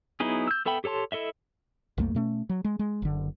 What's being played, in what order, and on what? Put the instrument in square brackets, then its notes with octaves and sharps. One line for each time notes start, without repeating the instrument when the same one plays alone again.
[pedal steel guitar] F#3 B3 D#4 E4 G#4
E6 G6
B3 A4 E5 G5 B5
G4 A4 C#5 A5 C6
E4 A4 D#5 E5
[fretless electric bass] B1 F2 A3 A#3
B2 A3 C#4
F#3
G#3
G#3
F#1 D3